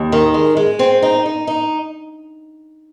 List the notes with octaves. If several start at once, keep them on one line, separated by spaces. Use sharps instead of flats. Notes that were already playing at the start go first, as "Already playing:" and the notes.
Already playing: D#2
D#3
G#3
G#3
C4
D#4
D#4
D#4